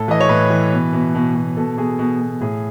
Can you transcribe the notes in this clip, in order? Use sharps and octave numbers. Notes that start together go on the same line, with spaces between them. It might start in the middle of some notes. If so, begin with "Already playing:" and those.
Already playing: A2 A4
E3 D#5
C#5
A2 B4
E3
B2
B2
B2
B2
B2 A4
B2 G#4
B2
B2
A2 G#4